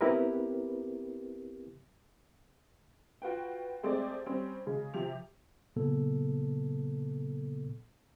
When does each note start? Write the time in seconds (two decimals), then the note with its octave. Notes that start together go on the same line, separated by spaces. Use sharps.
0.01 B3 C4 E4 G4 A#4 B4
3.22 F4 F#4 B4 G5
3.83 G#3 A3 C4 G4 G#4 D5
4.26 G3 C4 C#4
4.66 C#3 G#3
4.94 C3 F3 G4 F7
5.76 A#2 C#3 F#3 A#3 B3 A4